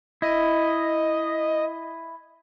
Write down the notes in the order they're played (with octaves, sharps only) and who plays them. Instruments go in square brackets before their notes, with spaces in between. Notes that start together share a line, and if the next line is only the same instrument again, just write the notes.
[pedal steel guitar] E4 [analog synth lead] D#5